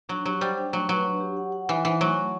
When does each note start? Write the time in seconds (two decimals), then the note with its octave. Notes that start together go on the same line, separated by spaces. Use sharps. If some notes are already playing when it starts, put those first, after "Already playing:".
0.09 F#3 D4
0.26 F#3 G4
0.41 G3 C5
0.57 D4
0.73 F#3 A3
0.89 F#3 B4
1.05 D4
1.20 G4
1.37 F#5
1.52 F#5
1.69 E3 F#5
1.85 E3 C5
2.01 F#3 A3
2.16 A3